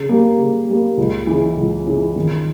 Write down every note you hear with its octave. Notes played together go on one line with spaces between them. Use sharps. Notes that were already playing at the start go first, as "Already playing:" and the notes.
Already playing: C#3
G3 A#3
C#3
G3 A#3
C#2
C#3 E3
C#2
C#3 E3
D#3